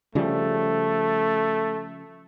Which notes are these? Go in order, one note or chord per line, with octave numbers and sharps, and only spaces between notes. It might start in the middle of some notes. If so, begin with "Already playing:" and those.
C#3 F3 G3 A3